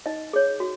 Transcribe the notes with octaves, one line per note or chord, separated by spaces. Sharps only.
D#4 D#5
G#4 C#5
F#4